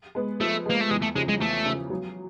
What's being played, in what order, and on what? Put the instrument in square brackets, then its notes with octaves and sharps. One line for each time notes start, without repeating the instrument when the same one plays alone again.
[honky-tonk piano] G#3 B3
[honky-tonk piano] F3 [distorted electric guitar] A3
[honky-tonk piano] G#3 B3 [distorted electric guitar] A#3
[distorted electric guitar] A3
[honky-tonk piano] E2 [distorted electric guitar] G#3
[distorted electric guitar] A3
[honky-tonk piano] C#3 F3 [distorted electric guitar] G#3
[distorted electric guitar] G#3
[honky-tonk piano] E2 [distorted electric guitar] A3
[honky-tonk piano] C#3 F3
F#3